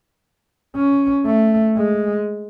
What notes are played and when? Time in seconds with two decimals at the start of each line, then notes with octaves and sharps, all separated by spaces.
0.76 C#4
1.26 A3
1.77 G#3